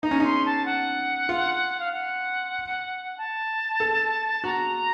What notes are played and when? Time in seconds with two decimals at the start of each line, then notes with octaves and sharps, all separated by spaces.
0.03 D#4 A#5
0.11 C#4
0.20 D#4 C6
0.46 A5
0.65 F#5
1.29 F4
1.80 F5
1.93 F#5
3.18 A5
3.80 A4
4.44 F#4 A#5